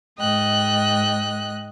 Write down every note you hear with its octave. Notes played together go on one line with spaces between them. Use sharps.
G#2 D#5 G5 F#6